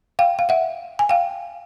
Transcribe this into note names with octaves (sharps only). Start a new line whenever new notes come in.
F5 G5
F5
E5 F#5
G#5
F5 G5